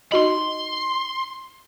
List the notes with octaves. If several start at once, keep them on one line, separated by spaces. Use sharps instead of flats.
D#4 F#4 D#5 B5 C6